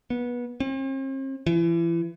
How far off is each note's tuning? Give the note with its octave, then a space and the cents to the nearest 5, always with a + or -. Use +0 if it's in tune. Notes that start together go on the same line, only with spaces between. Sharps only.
B3 -25
C4 +45
E3 +30